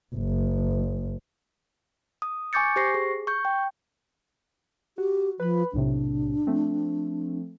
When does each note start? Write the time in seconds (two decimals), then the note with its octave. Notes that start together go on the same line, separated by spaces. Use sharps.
0.15 F#1
2.22 D#6
2.53 G#5 C#6 D6 G6 A6 C#7
2.76 G4 C5 C#6 A#6 C7
2.94 G#4
3.27 C#6 G6
3.45 G5
4.98 F#4 G4
5.40 F3 B4 B5
5.73 B1 A2 C3 D4
6.47 F3 A3 C4